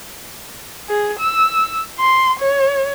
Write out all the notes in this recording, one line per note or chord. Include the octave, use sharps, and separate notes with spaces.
G#4
E6
C6
C#5